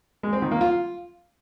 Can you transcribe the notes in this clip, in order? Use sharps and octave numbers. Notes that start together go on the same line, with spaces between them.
G#3
C4
D#3
A#3
F4